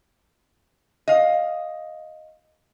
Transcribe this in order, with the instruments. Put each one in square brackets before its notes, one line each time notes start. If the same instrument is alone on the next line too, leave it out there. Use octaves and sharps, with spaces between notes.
[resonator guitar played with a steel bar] D#5 F5